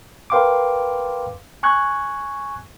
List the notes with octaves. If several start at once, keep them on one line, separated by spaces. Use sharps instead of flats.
A#4 B4 F5 G5 C6 D6
G#5 C#6 F#6 G#6